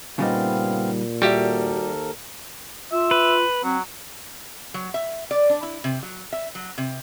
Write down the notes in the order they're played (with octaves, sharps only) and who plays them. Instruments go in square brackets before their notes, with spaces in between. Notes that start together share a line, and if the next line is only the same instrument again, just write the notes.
[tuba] A#2 [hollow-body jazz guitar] C#3 G3 D#4 [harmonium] B3 C4 F5
[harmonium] D#2 A4 A#4 [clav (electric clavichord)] G3 G4 [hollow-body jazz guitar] F#4 E5
[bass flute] F4 [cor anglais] E5
[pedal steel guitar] B4
[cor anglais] F#3 [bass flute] C4
[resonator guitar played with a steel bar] F#3
E5
D5
D4
E4
C3
F#3
E5
F#3
C3